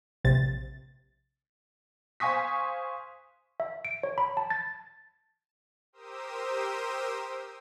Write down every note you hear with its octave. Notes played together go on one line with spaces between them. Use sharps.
A#1 C3 A6
C5 F5 G#5 C#6 D#6 B6
E5
D7
C#5
B5
A5
A6
G4 A#4 C5 D#6 E6